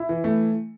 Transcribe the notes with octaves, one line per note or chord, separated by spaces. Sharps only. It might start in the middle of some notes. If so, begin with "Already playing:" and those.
Already playing: E4
E3
A3